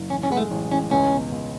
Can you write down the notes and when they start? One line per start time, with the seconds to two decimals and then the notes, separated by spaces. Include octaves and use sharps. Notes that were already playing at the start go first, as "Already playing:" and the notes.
Already playing: F#1
0.10 A1 C#4
0.23 C#4
0.30 G#3 B3
0.37 A3
0.51 A1
0.71 A1 C#4
0.91 C#2 C#4
1.12 B2
1.32 C#2